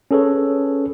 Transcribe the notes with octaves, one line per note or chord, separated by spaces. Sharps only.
C#4 G#4 A4 B4 C#5